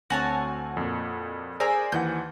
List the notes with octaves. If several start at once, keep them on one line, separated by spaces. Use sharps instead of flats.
D2 C4 F#4 C#5 G#5 A5
F2 A#2
G#4 A#4 C5 D5 E5 G#5
D#2 E3 F#5 G6